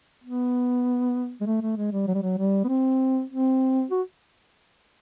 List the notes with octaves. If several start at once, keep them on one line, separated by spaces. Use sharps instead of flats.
B3
G#3
A3
A3
G#3
G3
F#3
G3
F#3
G3
B3
C4
C4
F#4